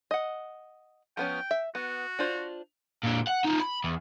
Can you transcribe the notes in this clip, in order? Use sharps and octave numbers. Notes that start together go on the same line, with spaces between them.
D#5 F#5
F3 B3 C#4 G5
E5
B3 F#4
D4 F4 C5
A#2 D3
F#5
D#4 F4
B5
E2